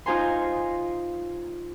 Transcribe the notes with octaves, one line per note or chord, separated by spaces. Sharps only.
D#4 F4 C5 G#5 A#5 C6